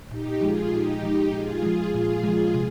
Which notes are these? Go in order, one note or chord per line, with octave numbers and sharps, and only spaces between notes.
A#2 D#4 G4
F3 G#3 F4 G#4
A#2 D#4 G4
F3 G#3
A#2 F4 G#4
F3 G#3
A#2 F4 G#4
F3 G#3
C3